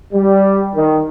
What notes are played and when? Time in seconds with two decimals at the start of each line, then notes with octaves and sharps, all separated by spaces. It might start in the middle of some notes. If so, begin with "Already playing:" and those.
0.13 G3
0.75 D#3